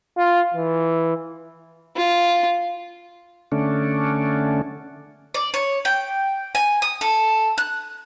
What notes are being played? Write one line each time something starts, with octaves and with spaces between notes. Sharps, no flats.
F4
E3
F4
D3 A3 C#4 D4
D5
C#5
G5
G#5
D#6
A4
F#6